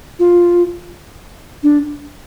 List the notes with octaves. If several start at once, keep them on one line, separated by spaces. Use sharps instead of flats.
F4
D4